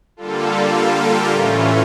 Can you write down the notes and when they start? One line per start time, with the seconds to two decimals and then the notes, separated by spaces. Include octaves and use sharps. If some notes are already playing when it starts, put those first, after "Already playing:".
0.17 D3 G3 A#3 F4 A4
0.45 F4
0.73 F4 A4
1.02 G4 A#4
1.29 A2 E3 A3 C#4 F4